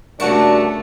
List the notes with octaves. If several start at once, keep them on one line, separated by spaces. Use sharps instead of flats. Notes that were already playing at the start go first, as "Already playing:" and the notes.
G2 C#3 A3 D4 F#4 A#4 A5 C#7